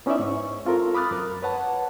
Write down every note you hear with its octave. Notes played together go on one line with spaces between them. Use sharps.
B3 C#4 D#4 E4 D5 E5
G#2 C#6
C4 F4 A4 A#4
B5 D6 D#6 F6 F#6 A6
F#2 A#4
B4 C#5 F#5 A5